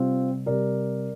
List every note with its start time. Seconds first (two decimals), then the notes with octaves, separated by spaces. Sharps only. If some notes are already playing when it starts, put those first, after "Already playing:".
Already playing: C3 G3 C4 F4
0.46 C3 G3 A#4 D5